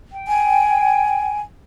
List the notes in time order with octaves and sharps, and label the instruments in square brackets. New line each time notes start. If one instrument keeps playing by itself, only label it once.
[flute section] G5
[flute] G#5